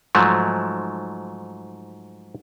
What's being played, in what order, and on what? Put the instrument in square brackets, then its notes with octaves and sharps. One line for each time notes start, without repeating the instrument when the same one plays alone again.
[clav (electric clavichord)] G#2 F3 F#3 A3